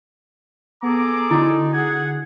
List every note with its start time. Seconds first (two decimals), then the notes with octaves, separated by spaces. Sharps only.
0.83 B3 G#4 A4 A#5 D6
1.31 D3 D#4 E4 F#4
1.73 G#4 F#5 G#6